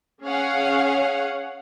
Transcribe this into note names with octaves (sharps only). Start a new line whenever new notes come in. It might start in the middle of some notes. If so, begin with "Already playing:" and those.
C#4 G#4 C#5 F5 F#5